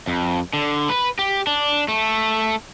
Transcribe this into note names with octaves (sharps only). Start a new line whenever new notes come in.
F2
D3
B4
G4
D4
A3